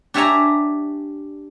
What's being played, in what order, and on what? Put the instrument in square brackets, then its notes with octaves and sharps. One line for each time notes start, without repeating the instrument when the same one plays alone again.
[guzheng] D4 G4 C#5 E5 G#5 A#5